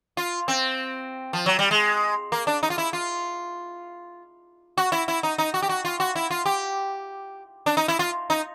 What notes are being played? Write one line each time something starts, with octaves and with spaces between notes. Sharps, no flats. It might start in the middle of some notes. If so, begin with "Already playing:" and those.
F4
C4
F3
F#3
G3
G#3
A#3
D4
D#4
F4
E4
F4
F#4
E4
E4
D#4
D#4
F#4
G4
F#4
F4
F#4
E4
F4
G4
D4
D#4
E4
F4
D#4